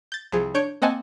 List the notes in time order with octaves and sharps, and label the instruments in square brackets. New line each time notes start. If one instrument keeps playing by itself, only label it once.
[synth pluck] G6 A6
C2 F3 G#4
D4 C#5 G6 C#7 D7
A#3 C4 D#5 F#5 G#5 A5